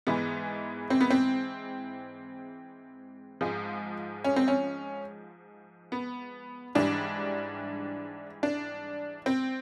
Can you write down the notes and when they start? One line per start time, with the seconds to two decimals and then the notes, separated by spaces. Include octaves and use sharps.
0.07 G#2 E3 G#3 B3
0.90 C4
1.01 B3
1.10 C4
3.41 G#2 F3 G#3
4.24 C#4
4.36 C4
4.48 C#4
5.92 B3
6.75 G#2 E3 G3 D4
8.43 D4
9.26 C4